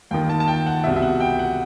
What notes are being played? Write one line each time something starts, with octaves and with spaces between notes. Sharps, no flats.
D#2 D#3 G5
A5
A5
G5
F#5
C2 B2 E5
E5
F#5
G5
F#5